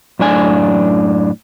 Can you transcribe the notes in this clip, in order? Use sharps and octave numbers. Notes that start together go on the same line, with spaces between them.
F#2 A2 D4 G#5